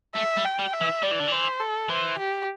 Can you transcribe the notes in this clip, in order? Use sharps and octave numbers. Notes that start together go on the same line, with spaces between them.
A3 E5
G3
G5
G3
E5
E3
G3 D5
E3
D3
E3 C5
A4
E3 C5
G4